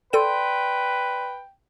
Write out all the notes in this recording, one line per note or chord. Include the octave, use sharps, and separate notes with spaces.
A4 B4 D5 G5 C6 D#7